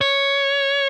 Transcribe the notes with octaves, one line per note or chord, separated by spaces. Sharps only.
C#5